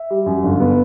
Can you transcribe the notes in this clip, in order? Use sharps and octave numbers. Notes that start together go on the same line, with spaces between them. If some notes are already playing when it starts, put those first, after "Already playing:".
Already playing: E5
G3
F#2
G1
B3